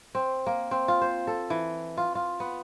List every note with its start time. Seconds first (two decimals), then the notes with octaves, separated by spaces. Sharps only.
0.15 C4
0.46 A#3
0.71 C4
0.88 F4
1.01 C5
1.27 A4
1.50 E3
1.97 F4
2.15 F4
2.40 B3